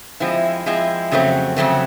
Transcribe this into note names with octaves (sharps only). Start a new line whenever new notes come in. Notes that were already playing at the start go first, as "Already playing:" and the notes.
F3 G#3 C4 E4
F3 G#3 C4 E4
F2 C#3 F#3 A3 C4
F2 C#3 F#3 A3 C4